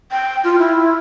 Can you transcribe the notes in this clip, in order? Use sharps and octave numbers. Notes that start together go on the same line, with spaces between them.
G5
F4
E4